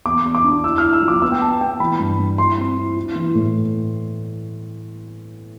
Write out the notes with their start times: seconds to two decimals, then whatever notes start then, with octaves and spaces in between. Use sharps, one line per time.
0.06 E2 D6
0.25 E2
0.35 D6
0.44 D4
0.64 E4 E6
0.78 E4 F6
0.93 E6
1.02 F3
1.08 D6
1.22 B3 E6
1.32 G5
1.41 B3 A5
1.61 B3 G5
1.80 E3 B5
2.00 G2
2.19 G2
2.38 E4 C6
2.58 C4
2.78 E4
2.97 E4
3.15 E3
3.35 A2